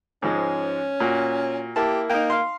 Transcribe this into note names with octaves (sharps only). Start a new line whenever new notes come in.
G#2 F3 G#3 C#4
A#2 F#4
A#3 E4 G4 A5
A#3 D#4 G5
F5 C6